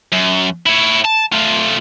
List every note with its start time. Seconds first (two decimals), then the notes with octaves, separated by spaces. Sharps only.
0.13 F#2
0.66 E4 C#5
1.04 A5
1.32 A3 F4